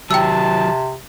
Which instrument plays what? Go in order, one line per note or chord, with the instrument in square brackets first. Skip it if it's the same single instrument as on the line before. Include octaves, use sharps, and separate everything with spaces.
[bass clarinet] C3 [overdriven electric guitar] D#3 F#3 [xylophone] G5 E6 [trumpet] A5